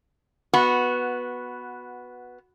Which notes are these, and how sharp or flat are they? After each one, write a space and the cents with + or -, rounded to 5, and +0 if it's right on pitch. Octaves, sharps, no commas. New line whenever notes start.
B3 -5 F#4 -10